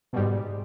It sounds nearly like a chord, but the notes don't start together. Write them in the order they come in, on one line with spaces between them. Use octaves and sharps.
B2 G3 G#2